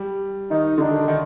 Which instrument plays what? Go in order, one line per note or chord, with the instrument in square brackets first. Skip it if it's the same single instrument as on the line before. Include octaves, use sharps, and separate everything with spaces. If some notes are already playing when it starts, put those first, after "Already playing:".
Already playing: [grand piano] G3
[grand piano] D#3 [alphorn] D#4
[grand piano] D3
[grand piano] D#3 [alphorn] D4
[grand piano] D#3